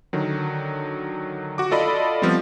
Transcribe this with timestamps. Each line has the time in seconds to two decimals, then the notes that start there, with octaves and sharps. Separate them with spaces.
0.13 D3 D#3 F#3
1.58 F#4 D6
1.71 F4 A4 D5 D#5 B5
2.22 F3 G3 B3 C4